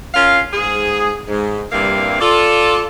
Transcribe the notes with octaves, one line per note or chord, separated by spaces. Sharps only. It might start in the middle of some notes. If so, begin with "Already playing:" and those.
C#4 F4 A#4 F5
G#2 G#4
G#2
G2 C3 G3 A#3 E4 F5
F4 A4 D5